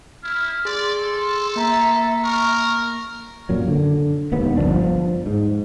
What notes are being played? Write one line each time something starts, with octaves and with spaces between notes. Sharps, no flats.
E4 F6
G#4 D5 C6
A4
A#3 E5 A#5
A#4 C#6
F#2 A#2 F#3
D3
E1 D#2 B3
G1 F#2 F3 D4
F3
G#2